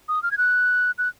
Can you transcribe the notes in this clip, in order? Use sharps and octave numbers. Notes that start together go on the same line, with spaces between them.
D#6
F6
G#6
F#6
F#6